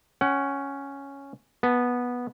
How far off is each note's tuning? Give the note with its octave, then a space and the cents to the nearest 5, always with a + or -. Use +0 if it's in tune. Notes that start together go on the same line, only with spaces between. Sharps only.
C#4 +0 F#5 +30
B3 -10 A5 +0